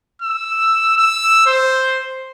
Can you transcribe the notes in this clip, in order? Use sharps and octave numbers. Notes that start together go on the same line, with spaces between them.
E6
E6
C5